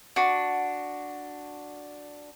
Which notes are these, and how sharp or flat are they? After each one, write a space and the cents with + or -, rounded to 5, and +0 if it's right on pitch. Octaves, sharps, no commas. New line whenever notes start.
D4 +0 F#4 -5